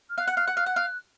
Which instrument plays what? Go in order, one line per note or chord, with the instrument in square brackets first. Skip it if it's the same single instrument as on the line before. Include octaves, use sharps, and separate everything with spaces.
[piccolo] F6
[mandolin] F5 [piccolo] F#6
[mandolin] F#5
F5
F#5
F5
F#5
F5